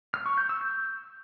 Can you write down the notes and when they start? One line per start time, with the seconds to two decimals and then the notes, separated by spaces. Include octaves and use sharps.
0.14 F6
0.26 C#6
0.38 G6
0.49 E6
0.61 G6